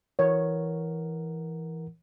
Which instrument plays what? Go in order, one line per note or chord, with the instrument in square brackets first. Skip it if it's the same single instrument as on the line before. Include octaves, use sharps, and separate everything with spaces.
[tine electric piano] E3 A#4 F#5 [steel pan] C#5